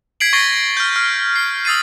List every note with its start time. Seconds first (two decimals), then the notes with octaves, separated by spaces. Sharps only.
0.20 G#6 B6 C7 D7 F#7
0.33 C#6 A6 A#6 C7 D7 G7
0.77 F6 G6
0.96 F6
1.36 C7
1.65 D#6 E6 A6 C7 D#7